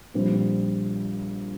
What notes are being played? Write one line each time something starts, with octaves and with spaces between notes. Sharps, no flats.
A#1 A#2 G3 C4